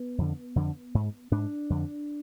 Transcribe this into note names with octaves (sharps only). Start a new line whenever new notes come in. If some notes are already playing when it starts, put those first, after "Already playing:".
Already playing: B3
F2 D3
F2 D3
G#2
G#2 D4
F2 D3